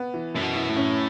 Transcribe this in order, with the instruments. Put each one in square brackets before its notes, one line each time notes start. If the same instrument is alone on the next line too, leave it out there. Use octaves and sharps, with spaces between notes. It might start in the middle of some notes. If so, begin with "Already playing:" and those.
Already playing: [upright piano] B3
E3
[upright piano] F#2 [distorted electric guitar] A2
[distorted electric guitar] B2
[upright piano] E4
[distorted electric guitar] A2
[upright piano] C#4